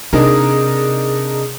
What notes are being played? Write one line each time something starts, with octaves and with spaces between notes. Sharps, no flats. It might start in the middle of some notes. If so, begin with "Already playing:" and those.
C3 D4 D#4 G#4 A#4 D#6